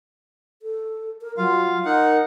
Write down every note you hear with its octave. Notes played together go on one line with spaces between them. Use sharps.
A4
A#4
F#3 F4 F5
D#4 A#4 F#5